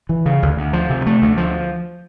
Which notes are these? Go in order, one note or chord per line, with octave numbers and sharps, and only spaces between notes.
E3
C#3
D2
D2
F3
C3
A3
D2
F3